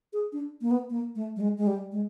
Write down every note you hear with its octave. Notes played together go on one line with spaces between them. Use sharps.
G#4
D4
A#3
B3
A#3
A3
G3
G#3
G#3
G3
G#3